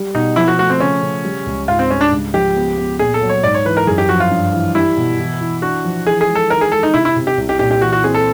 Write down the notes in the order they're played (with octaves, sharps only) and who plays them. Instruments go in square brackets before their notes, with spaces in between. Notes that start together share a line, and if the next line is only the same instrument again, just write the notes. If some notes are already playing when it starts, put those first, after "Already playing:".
Already playing: [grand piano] G3
[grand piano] B2 [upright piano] D#4
[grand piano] F3 [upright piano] E4
[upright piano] F#4
[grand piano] A3 [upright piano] F#4
[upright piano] C4
[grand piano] C#3 [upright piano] C#4
[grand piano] C#3
G3
C#2
[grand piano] G#2 [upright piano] F4
[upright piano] C4
[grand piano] G3 [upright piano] C#4
[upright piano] D4
[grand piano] C#2
[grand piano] F3 [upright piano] G4
[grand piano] B3
B3
[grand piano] A#2 [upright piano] G#4
[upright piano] A4
[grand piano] F#3
[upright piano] C#5
[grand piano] G#2 [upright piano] D5
[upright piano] C#5
[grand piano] E3 [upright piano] B4
[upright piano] A#4
[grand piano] F#2 [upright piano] G#4
[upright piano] G4
[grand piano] F3 [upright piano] F#4
[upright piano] F4
[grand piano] G2
E3
[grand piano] G3 [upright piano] E4
[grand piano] B2
E3
E3
[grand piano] D4 [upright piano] F#4
[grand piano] F3
[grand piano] E3 [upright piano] G#4
[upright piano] G#4
[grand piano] G#3
[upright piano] A4
[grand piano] D#3 [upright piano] A#4
[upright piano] G#4
[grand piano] G#3 [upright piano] A4
[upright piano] D#4
[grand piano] C3 [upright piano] E4
[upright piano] E4
[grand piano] C3
[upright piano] G4
[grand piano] C2
[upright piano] G4
[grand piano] A#2 [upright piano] G4
[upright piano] G4
[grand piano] E3 [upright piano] F#4
[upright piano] F#4
[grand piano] C4 [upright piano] G#4
[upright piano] A4